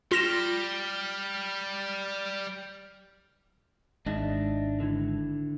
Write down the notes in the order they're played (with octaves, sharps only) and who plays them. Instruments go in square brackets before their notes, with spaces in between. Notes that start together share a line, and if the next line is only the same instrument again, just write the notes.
[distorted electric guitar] G3 [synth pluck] F4 A#6 E7 [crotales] F6 F7 G7
[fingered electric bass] G#1 G#2 [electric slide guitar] D4 D#5 E5
[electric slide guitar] D3 E4